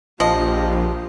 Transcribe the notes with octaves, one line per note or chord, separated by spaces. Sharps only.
A#1 F3 F4 G4 D#5